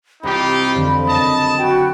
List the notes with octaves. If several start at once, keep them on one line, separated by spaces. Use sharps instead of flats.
C2 D#4 F4 G4 B5
F2 D3 F3
F#1 D#5 A5 D#6
F#4 G5